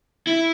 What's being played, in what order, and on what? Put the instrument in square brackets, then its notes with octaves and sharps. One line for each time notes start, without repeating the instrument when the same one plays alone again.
[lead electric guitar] E4